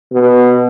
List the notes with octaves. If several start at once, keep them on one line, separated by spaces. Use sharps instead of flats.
B2